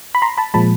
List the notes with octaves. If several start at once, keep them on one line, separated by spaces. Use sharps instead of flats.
B5
A#5 C6
A5 B5
A#2 F3 G#3 A5 B5